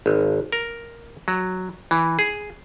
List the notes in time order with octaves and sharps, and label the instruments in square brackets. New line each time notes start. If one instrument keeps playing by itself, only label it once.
[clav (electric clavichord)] G#1
A#4
F#3
E3
G#4